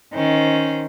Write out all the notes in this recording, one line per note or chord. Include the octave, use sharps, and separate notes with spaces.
D#3 C#4 C5